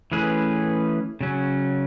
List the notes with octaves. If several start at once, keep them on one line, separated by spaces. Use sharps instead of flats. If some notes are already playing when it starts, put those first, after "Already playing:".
E3 A3 C#4 G#4 B4
C#3 F#3 C#4